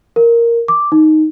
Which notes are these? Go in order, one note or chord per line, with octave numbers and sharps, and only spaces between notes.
A#4
D6
D#4